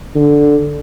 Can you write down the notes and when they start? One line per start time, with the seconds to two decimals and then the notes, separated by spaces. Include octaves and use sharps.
0.15 D3